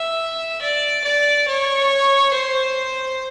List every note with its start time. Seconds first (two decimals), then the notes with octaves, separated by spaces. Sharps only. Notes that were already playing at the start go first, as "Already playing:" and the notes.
Already playing: E5
0.61 D5
1.04 D5
1.47 C#5
2.33 C5